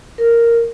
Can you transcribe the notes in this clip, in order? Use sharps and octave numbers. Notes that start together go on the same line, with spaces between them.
A#4